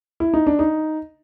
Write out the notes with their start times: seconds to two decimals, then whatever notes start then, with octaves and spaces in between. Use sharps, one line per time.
0.20 E4
0.34 D#4
0.47 D4
0.59 D#4